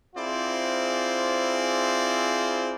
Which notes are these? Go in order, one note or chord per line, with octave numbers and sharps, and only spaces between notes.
C4 E4 F4 G#4 C5 D5